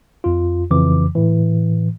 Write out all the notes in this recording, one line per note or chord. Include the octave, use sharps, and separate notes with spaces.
F2 F4
F2 C#3 E3 D6
A2 E3